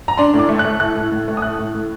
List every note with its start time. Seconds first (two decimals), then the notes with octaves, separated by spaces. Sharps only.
0.08 A#5
0.17 D4 C6
0.34 A2
0.39 D6
0.49 A3
0.59 F#6
0.65 A3
0.80 A2 F#6
0.96 A2
1.12 A2
1.28 A3
1.37 D#6
1.42 A2 F#6
1.59 A2
1.75 A2